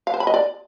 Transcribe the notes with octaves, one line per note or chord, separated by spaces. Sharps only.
F5
C5
B5
D#5
D5